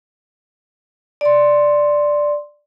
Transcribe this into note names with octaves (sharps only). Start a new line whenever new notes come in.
D5 C6